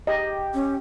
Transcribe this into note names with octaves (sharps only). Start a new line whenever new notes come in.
G4 D#5
C#4